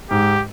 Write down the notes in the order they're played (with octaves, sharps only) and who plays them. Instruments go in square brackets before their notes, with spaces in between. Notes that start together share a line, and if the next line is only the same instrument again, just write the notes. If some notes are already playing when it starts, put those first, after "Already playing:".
[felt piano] G#2 [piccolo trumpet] G4